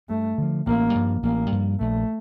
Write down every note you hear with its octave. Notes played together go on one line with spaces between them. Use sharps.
G2 A3
D3 F3
A1 A#3
G2 F3
A1 A#3
G2 F3
A#1 A3